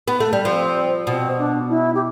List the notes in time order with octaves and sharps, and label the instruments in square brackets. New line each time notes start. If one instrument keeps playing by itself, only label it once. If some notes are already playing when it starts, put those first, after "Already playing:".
[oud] B3
A3
G3
[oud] F3 [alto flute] C4
[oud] B2 [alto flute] C4
[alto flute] D4
E4
G4